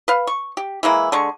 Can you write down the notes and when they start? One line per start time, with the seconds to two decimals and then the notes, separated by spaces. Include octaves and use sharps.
0.08 B4 F5
0.27 C#6
0.57 G4
0.83 E3 G#3 A#3 E4
1.12 D3 G#3 C#6